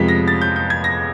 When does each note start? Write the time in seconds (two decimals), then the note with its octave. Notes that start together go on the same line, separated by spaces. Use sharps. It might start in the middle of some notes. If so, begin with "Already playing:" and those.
Already playing: F2 C3 F3 G#3 B3 B6
0.08 A#6
0.28 A6
0.41 G6
0.56 G6
0.70 G#6
0.84 A#6